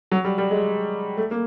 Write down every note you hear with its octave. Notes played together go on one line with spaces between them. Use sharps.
F#3
G3
G3
G#3
A3
A#3